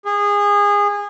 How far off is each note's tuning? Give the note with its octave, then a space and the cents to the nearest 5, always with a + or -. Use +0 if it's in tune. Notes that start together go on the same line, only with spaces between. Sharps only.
G#4 -25